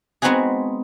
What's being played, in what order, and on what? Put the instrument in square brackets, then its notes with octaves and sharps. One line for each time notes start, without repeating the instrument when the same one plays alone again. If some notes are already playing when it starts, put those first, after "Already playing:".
[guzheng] G#3 B3 C4 D#4 F#4 G#4